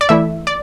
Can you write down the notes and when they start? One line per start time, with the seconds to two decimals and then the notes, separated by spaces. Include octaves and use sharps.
0.01 D5
0.09 E3 A3 E4 E5
0.47 D5